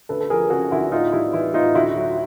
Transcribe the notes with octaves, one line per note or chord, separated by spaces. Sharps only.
D2 A4 B4
A4
F3 G#4 A#4
C#3 F#4 G#4
D2 E4 F#4
A2 D#4 F4
G3 E4
E3 E4
A2 D#4 F4
D2 E4 F#4
F#3